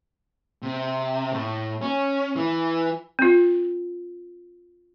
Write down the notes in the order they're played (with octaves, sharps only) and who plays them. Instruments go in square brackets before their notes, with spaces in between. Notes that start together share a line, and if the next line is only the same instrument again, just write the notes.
[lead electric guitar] C3
A2
C#4
E3
[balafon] C4 F4